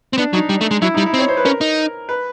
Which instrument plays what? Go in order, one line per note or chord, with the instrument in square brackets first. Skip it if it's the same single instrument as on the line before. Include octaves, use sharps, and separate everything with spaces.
[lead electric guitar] C4
[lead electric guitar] B3 [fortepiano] D4
[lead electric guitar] F#3 [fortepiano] D#4
[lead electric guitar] G3
A3
G#3
[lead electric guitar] F#3 [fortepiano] E4
[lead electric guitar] G3 [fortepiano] D#4
[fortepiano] E4
[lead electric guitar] C4
[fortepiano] C#5
C5
B4
[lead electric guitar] C#4 [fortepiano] A#4
[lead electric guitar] D#4
[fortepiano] B4